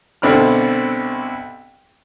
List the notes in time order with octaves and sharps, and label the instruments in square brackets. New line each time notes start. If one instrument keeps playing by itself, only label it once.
[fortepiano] C2 B2 D3 C4 B5 F6